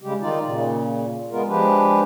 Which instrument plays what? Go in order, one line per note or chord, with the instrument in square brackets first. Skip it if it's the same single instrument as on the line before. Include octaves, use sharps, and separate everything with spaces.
[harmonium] C#3 G3 G#3 G4
D#3 D#4 F4 D5
A#2 C#3
G#3 B3 F4 A#4
F3 G#3 D4 G4 B4